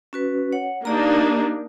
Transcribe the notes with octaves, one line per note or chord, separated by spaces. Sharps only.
C#4 F#4 B4
C#5 F#5
A#3 D4 D#4 G4 D5 A#5